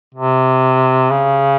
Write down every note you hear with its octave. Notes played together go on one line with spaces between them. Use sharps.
C3
C#3